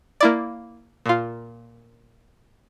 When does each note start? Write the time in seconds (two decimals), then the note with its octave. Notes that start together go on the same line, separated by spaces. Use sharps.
0.21 A#3 E4 D5
1.06 A#2 F4